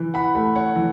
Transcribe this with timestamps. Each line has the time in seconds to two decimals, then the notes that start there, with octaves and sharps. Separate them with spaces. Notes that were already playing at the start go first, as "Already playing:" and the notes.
Already playing: E3
0.14 F#5 B5
0.35 A3 F#5 B5
0.56 C#5 F#5
0.76 E3